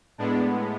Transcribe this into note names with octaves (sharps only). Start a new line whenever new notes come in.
A2 G#3 B3 D4